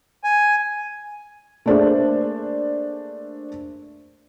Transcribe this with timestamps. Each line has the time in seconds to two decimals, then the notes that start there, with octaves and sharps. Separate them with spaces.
0.24 G#5
1.66 A3 A#3 D4 G#4 C5 E5